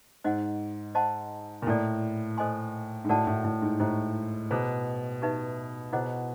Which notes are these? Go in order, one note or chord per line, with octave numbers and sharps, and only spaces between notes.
G#2 C5 D#5 F#5
C5 D#5 F#5 A5 C6
A#2
A2 E4 A4 D5
A4 C5 D#5 G#5 C6
G#2
A2 F#4 A#4 D5 F#5 A5
A2
A2
G#2
A2 E4 G4 C5 D#5
B2 E4 G#4 C5
D#4 G4 B4 E5
B2 E4 G#4 C5 D#5 F#5